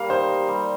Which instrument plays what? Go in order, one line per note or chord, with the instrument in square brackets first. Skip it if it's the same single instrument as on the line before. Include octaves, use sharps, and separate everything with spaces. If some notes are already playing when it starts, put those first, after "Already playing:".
Already playing: [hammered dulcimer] G3 A#3 [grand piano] F5
[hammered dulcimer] D#4 [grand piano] C5
[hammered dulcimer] D#4
G3